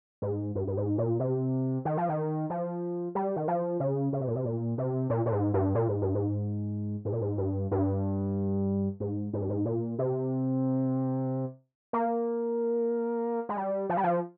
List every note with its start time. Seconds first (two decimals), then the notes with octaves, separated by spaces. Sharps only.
0.22 G#2
0.55 G2
0.67 G2
0.77 G#2
0.98 A#2
1.20 C3
1.85 D#3
1.97 F3
2.09 D#3
2.50 F3
3.15 G3
3.36 D#3
3.48 F3
3.80 C#3
4.13 C#3
4.21 C3
4.27 A#2
4.36 C3
4.45 A#2
4.78 C3
5.10 A#2
5.26 A#2
5.32 G#2
5.54 G2
5.75 A#2
5.88 G#2
6.02 G2
6.15 G#2
7.05 G#2
7.12 A#2
7.21 G#2
7.38 G2
7.71 G2
9.00 G#2
9.33 G#2
9.41 G2
9.50 G#2
9.65 A#2
9.99 C3
11.93 A#3
13.49 G#3
13.57 G3
13.89 F3
13.97 G3
14.03 F3